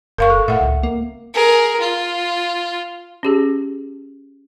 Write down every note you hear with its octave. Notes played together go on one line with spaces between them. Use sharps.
F#1 A#4 F5 C#6
A4
A2 E5 F#5
C#2
A#3
G#4 A#4
F4
C#4 G4 G#4